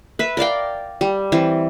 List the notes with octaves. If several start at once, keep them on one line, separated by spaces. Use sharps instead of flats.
B4 E5
A#4 D5 F5 G5
G3
E3 C4